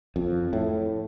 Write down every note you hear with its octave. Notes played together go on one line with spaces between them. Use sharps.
F2
A2